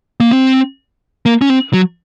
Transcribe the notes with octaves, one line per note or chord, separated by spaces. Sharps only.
A#3
C4
A#3
C#4
C4
F#3